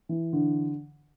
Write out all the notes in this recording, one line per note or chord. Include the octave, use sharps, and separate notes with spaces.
E3
D3